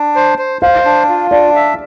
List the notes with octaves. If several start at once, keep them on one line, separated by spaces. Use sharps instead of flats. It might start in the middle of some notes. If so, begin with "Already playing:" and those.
Already playing: D4
C5
C5
C5 F5
D4
F4
D4 D5
E5